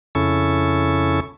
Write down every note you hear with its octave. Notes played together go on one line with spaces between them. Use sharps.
F2 C#3 C#4 E4 A4 C#6